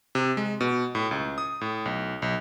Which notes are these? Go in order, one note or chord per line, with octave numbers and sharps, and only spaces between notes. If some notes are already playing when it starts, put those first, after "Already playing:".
C3
G#3
B2
A2
C#2
D#6
A2
B1
B1